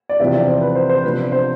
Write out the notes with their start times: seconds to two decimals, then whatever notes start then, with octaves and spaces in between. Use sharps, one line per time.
0.09 D5
0.20 E2 C3 F3 C4 E5
0.34 D5
0.48 C5
0.61 B4
0.75 C5
0.90 C5
1.04 C3 F3 B3 D4 B4
1.18 D5
1.32 C5